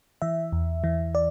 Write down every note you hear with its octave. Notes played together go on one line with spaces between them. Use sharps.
E3 E5
E2
E3
D5